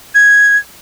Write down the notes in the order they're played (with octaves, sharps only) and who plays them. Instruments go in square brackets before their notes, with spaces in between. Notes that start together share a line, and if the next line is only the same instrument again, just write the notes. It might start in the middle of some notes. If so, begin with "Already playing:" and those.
[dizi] G#6